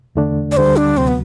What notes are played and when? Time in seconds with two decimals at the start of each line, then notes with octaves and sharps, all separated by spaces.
0.15 E2 D3 A3 D4
0.52 D5
0.56 D2 D3 G3 C5
0.77 D4
0.97 D2 C3 F#3 C4
1.07 B3